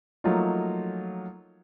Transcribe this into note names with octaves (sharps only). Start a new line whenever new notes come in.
F3 F#3 A3 A#3 D#4 F4